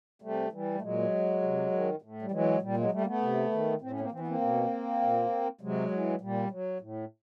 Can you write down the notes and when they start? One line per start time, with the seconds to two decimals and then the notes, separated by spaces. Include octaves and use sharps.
0.22 C3 G3 A3
0.52 E3 G3
0.74 A3
0.82 A#2 F#3 G#3
1.42 C3
1.71 D#3
2.02 A2
2.22 G3
2.31 E3 F#3 G#3
2.62 A#2 G3
2.77 F#3 G#3
2.92 G3 A3
3.01 A#3
3.06 A3 B3
3.21 C3
3.52 D#3
3.81 A2 C4
3.91 C#4
4.00 A#3 C4
4.12 E3 C4
4.20 B3
4.28 A#3 C4
4.41 B2
5.01 A#2
5.61 C3 F#3 G#3
5.91 E3
6.21 A#2 G3
6.51 F#3
6.81 A2